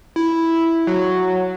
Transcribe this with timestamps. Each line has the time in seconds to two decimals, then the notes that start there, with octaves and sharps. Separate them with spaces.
0.16 E4
0.87 F#3